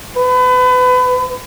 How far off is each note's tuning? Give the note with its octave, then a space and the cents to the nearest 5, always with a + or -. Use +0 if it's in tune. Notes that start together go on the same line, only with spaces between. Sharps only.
B4 +30